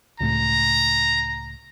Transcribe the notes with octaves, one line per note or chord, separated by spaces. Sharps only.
C#2 A2 A#5